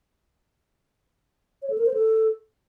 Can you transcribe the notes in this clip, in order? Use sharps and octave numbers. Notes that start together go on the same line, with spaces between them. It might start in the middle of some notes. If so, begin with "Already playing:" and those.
C#5
A4
A#4
C5
A4